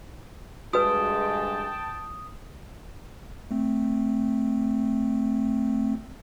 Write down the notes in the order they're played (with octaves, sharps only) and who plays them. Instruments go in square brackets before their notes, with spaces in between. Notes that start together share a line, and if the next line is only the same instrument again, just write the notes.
[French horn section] D2 G2 G#3 [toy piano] F#4 B4 [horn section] G5 A5 [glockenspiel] D#6
[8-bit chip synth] A3 C4